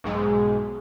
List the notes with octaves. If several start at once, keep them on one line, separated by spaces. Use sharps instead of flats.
B1 G#2 G#3